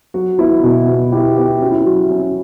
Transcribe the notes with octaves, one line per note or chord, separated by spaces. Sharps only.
F#3 F#4
B3 E4
B2 F#4
B3 F#4
B3 E4 G4
B3 G4 B4
C#4 F#4
E4
F#3 F#4
C#4